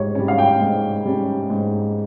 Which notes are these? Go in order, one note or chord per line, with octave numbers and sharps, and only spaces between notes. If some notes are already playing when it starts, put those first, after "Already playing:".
Already playing: G#2 G4 C#5
G3 C#4 C#5
F5
G5
G#2
G3 C#4
G#2